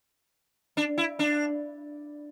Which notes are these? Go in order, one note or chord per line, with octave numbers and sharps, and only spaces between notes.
D4
E4
D4